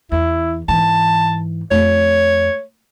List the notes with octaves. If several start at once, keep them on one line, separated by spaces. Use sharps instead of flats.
E2 E4
G#2 E3 A5
F2 A3 C#5